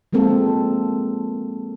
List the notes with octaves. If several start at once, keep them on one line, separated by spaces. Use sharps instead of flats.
F3 G#3 A#3 C4 A4